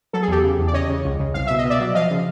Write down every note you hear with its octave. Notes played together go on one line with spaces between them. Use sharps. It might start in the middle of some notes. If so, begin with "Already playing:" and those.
F#3 A4
G#4
E2 G4 A4
C#3
E2
D5
C#3 C#5 D#5
C#3
C#2
C#3
C2 F5
B2 E5
D#5
B2
D5 E5
F#3
F3 D#5 F5
C#3